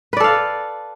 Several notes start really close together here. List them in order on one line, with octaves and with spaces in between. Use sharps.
B4 D5 A4 F5